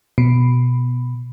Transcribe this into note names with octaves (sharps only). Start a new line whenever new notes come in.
B2